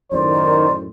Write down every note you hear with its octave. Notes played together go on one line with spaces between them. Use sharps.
F#2 A2 D#3 C5 D5